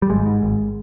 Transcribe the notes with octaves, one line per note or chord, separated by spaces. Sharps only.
G3
G#1 G#3
G#2
G#1